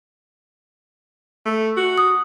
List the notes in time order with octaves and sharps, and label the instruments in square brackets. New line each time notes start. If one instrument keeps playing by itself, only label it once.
[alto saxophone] A3
F#4
[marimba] D#6